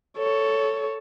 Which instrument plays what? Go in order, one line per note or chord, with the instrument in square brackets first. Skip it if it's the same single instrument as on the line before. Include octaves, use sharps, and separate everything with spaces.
[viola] A4 [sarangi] C#5